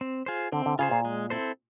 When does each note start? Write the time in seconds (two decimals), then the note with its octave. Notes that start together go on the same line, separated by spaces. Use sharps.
0.01 C4
0.26 F4 G#4 C5
0.52 D3 C4
0.66 D3
0.79 C#3 F4 G#4 C5
0.91 A#2
1.05 G#3
1.30 C4 E4 A4 C5